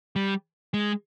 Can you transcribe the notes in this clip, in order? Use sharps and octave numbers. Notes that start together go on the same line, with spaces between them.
G3
G#3